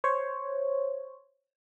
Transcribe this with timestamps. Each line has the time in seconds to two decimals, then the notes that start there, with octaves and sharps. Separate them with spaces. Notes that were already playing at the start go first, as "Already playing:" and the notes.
0.04 C5 C#5